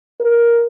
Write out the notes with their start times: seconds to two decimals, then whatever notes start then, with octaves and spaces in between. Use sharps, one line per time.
0.20 A#4